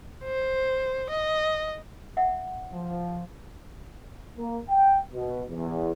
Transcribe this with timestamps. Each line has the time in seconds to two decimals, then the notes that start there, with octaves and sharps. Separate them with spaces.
0.24 C5
1.09 D#5
2.17 E5 F#5
2.73 F3
4.37 A#3
4.69 G5
5.14 B2
5.50 E2